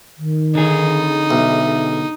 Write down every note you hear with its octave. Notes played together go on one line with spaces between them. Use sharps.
D#3
D3 D#4 G#4
B1 E5